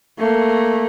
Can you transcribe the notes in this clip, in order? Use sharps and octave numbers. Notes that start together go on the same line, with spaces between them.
A3 A#3